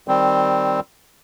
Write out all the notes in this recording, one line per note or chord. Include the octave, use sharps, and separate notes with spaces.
D#3 G3 C4